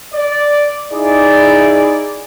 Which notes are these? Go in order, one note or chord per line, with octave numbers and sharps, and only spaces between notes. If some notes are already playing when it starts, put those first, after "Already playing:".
D5
D#4 E4 G#4 D5